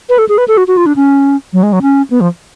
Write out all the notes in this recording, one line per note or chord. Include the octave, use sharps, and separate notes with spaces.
B4
A4
G#4
B4
A4
F#4
F#4
F4
D4
C#4
F#3
G#3
F#3
C#4
B3
F3